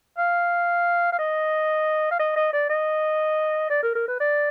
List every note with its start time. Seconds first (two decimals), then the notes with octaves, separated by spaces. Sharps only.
0.18 F5
1.12 F5
1.19 D#5
2.11 F5
2.19 D#5
2.36 D#5
2.53 D5
2.69 D#5
3.70 D5
3.83 A#4
3.95 A#4
4.08 B4
4.20 D5